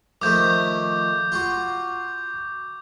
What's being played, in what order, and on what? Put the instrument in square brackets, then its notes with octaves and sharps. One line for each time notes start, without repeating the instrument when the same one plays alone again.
[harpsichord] D#3 F3 A3 [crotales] D6 G6
[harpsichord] F4 F#4